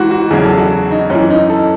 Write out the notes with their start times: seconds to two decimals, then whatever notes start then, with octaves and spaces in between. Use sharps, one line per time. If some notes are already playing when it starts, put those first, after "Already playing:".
Already playing: G#2 E3 F#4
0.11 F#4
0.31 E2 C#3 F#3 G#4
0.44 A4
0.58 F#4
0.91 D#4
1.10 F#2 E3 C#4
1.30 D#4
1.50 A4